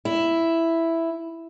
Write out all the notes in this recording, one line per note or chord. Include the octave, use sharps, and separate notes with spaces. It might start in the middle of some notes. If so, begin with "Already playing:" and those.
E4